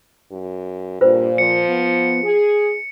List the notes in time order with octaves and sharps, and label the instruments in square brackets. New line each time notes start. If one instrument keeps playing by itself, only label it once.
[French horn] F#2
[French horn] G2 [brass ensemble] A#2 [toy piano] F4 B4 C5
[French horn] F3 [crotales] C#7
[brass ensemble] B3
G#4